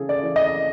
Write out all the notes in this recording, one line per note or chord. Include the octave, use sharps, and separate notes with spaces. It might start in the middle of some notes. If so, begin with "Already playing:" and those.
Already playing: C#3 E3 G#4 A4
D5
E3
D#5